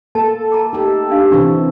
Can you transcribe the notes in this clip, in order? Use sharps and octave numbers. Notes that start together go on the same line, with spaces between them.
A#3 A4 A5
A5 A#5 D6
D#4 G4 A4
D4 F5
C3 E3 C4 D4 C#6 E6